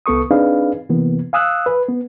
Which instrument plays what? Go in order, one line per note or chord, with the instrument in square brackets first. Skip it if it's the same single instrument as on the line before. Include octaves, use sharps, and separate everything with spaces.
[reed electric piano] C2 B3 A4 C#6 D#6
C4 D4 D#4 G#4 B4 F5
C3 E3 A#3 B3
F5 G#5 D#6 E6 F#6
B4
B3